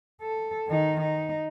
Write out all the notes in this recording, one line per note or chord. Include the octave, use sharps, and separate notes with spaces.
A4
D#3 D#4
D#4